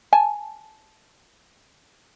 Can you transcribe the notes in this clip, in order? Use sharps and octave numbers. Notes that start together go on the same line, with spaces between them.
G#5 A5